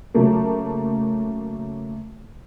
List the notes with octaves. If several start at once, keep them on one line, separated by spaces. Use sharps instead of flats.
C#3 F#3 A3 A#3